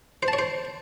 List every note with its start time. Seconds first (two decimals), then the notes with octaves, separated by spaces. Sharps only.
0.23 C5
0.28 A5
0.33 C#5
0.39 C5